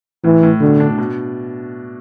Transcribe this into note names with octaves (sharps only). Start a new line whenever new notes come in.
A2 E3
A2
B2 D3
D4
B2